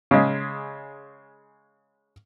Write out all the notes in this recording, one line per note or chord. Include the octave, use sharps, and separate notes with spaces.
C#3 G#3